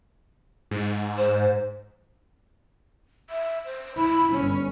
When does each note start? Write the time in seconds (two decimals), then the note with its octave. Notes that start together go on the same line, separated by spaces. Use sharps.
0.71 G#2
1.17 C5
3.30 E5
3.66 C5
3.96 E4 B5
4.32 G1 C#4